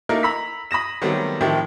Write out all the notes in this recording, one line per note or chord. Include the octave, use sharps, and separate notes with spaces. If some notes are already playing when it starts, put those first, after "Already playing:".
A3 A#3 D#4 E4 A#4
A#5 B5 E6 B6
B5 D#6 A#6 E7
D#3 F#3 G3 A3 B3 C4
A2 D#3 F3 C4 E4 G4